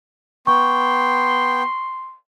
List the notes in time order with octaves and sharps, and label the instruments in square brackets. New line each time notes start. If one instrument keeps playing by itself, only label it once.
[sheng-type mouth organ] B3 G5 [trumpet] C6 [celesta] C#6